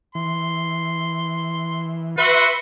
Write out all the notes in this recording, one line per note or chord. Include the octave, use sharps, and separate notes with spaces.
E3 C6
F#4 B4 E5 C6